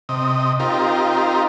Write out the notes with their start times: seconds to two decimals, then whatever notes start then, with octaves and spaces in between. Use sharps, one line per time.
0.09 C3 D#5
0.60 C4 D#4 F4 G4 A#4